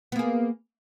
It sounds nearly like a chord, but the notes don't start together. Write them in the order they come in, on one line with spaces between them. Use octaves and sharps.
B3 A#3 G#4